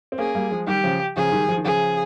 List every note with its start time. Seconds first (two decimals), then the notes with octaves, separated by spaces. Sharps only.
0.12 C4
0.18 A#3 C#4 G#4
0.35 G3 A#3
0.51 F3 G#3
0.67 D#3 G3 G4
0.84 C#3 F3
1.16 C#3 F3 G#4
1.32 D#3 G3
1.49 F3
1.57 D#3
1.65 C#3 F3 G#4